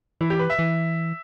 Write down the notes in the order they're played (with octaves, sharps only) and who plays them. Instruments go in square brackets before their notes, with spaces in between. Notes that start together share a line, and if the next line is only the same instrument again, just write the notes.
[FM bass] E3 [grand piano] E4
[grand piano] G4
B4
E5
[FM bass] E3